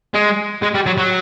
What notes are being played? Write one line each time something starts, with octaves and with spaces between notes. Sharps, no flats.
G#3
G#3
G3
F#3
F#3